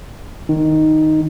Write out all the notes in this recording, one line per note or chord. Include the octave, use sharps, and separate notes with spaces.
D#3